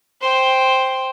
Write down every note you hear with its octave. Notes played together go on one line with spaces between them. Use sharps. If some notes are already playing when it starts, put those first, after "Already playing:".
C5 G5